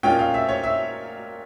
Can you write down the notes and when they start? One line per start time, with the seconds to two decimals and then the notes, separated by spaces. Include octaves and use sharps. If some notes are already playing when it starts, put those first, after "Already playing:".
0.03 A#2 G#3 C#4 F4 G5
0.19 F5
0.34 E5
0.49 C#5
0.64 E5